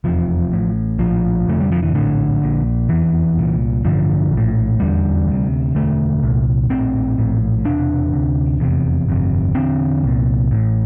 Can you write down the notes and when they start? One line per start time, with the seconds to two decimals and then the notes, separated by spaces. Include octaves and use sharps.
0.04 F1 E2 C3 F3
0.52 A1 A2
0.99 A#1 A2 F3
1.47 F1 F2 D3 A3
1.60 G3
1.72 F3
1.83 E3
1.94 A#1 A2 D3
2.42 A#1 A#2
2.89 F1 E2 C3 E3
3.38 C2 A#2
3.85 A1 G2 D3 F3
4.32 A#1
4.37 A2
4.79 F1 E2 D3 G3
5.28 D2 C3
5.75 E1 D2 D3 A3
6.23 C2 A#2
6.69 A#1 A2 C4
7.18 A#1 A2
7.65 E1 E2 C3 D4
8.13 D2 C3
8.60 F1 E2 C3
9.09 G1 F2 C3
9.55 E1 E2 D3 C4
10.03 C2 A#2
10.51 A1 A2